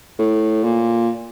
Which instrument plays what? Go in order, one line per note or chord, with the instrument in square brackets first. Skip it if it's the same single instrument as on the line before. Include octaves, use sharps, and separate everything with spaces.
[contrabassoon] A2
A#2